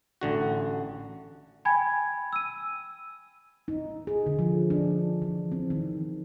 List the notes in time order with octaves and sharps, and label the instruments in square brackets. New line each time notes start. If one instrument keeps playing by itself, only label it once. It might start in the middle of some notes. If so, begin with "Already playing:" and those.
[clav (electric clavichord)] A1 D3 F#4
[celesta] G5 G#5 B5 G#6
E6 D#7
[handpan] D#4
G#4
D3
F3
D4
E3
C4
D#3